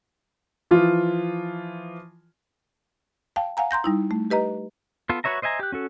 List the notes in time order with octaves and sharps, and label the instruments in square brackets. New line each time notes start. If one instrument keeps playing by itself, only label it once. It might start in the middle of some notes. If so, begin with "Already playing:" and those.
[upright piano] E3 F3 F4
[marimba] F5 G5 A5
F5 F#5 G#5 A#5
A#5 C6 G6 A#6
G3 D#4 E4
A3
G4 B4 D#5 A#5
[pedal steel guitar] B3 F4 A4
F#4 B4 C#5 E5 A#5
C5 D#5 E5 G#5 A#5
G4 F#6
C#4 F#4 A4